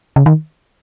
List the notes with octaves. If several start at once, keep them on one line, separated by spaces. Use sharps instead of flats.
C#3
D#3